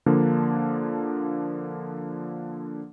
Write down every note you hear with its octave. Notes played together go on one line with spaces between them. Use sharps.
D3 F3 A#3 D4